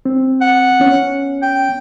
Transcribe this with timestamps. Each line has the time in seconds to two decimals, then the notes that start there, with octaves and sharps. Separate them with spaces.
0.05 C4
0.41 F#5
0.80 B3 C#4
1.42 G5